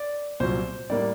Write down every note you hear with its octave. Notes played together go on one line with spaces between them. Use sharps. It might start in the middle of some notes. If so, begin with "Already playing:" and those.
Already playing: D5
C2 A#2 F#3 C5
A2 G3 A#3 D5